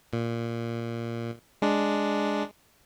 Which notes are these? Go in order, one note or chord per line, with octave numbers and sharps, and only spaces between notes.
A#2
G#3 D4